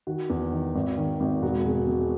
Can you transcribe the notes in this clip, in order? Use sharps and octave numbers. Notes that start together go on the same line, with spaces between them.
D#3 F#4
E2
D#3
G#1
D#3
G#1
E1 F#4
B2 G#4
B2 G#4